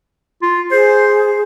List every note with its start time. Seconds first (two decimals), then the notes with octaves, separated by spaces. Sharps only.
0.42 F4
0.71 G#4 C5